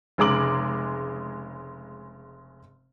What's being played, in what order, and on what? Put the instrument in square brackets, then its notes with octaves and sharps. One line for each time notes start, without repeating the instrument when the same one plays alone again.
[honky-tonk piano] F1 C#3 G#3 A#5 D6 F#7